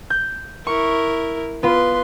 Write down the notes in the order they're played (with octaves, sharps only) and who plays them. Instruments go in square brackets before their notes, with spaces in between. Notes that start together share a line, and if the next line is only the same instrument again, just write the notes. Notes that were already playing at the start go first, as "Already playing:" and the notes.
[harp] G6
[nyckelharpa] E4 A#4 [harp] C#6
[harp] B3 F4 [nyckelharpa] B4 C6